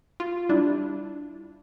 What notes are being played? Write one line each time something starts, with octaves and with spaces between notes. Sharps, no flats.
F4
G3 D4 E4